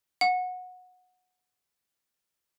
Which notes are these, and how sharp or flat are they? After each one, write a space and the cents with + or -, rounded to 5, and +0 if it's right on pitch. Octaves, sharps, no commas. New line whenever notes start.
F#5 -20